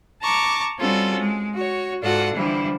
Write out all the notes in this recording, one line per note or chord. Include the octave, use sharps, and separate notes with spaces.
A5 A#5 C#6 D6
G3 C4 C#4 F4 F#4 A4
G#3
F#4 C#5
G#2 F4 F#4 A4 D5 F#5
D3 E3 F3 G3 E4